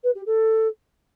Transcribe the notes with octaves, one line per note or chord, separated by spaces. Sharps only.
B4
G4
A4